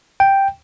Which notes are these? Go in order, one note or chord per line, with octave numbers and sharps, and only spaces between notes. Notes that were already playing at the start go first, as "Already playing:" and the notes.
G5